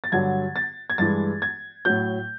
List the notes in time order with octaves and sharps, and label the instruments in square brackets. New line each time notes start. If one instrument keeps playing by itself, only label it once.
[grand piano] A6
G2 D3 F#3 G#6
A6
G#6
G2 E3 G#3 A6
G#6
A2 F#3 G6